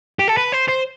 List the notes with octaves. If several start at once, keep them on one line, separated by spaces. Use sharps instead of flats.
G4
A4
B4
C5
C5